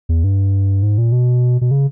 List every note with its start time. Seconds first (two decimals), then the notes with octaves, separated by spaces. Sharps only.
0.09 E2
0.24 G2
0.83 G#2
0.98 A#2
1.12 B2
1.61 B2
1.71 C#3